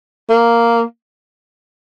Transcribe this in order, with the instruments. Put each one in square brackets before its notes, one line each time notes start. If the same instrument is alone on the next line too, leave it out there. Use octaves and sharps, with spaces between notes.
[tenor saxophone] A#3